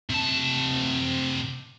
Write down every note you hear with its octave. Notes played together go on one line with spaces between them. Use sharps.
C3 A5